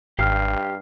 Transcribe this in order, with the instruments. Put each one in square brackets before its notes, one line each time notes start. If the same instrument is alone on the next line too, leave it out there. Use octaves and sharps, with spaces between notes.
[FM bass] G#1 [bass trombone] G2 [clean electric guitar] G4 F5 G5 [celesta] F6 C7